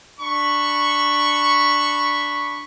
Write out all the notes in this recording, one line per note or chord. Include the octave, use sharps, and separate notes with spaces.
D4 B5 C#6